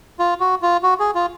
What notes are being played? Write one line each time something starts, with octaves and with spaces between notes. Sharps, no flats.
F4
F#4
F4
F#4
G#4
F4